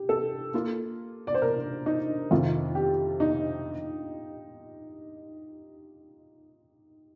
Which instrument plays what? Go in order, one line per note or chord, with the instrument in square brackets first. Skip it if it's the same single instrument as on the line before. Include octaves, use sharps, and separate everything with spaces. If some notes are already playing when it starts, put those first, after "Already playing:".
Already playing: [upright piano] G4
A4
[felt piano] A#3 F4 A4
[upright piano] D5
C5
A#4
D#4
[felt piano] F2 C3 D#3 [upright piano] F4
[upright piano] G4
D#4